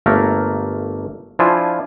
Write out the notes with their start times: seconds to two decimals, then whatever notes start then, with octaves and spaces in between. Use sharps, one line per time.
0.06 G1 A3 A#3 A#4
1.39 F3 D4 E4 F4 G#5